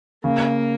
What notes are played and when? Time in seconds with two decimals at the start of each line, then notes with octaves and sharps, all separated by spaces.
0.24 C#3 A#3